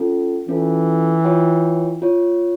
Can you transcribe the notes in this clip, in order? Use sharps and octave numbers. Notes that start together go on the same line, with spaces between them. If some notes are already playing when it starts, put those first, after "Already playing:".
Already playing: C#4 F4 A4
E3 C#4 F4 A4
F4 C#5 G5
F4 C#5